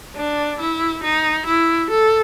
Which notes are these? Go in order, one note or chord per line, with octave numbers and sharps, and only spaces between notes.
D4
E4
D#4
E4
A4